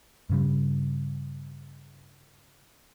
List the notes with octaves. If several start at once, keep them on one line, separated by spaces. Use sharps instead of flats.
G2 C#3 G3